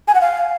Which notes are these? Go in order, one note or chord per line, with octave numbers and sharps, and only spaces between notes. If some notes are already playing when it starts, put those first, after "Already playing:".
G#5
F#5
F5